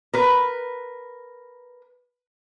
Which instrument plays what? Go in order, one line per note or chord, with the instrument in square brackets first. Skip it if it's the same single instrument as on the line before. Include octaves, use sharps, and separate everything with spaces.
[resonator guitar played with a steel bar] A#4 B4